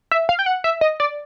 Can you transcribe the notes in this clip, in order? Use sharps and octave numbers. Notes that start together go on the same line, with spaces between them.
E5
F5
G5
F#5
E5
D#5
D5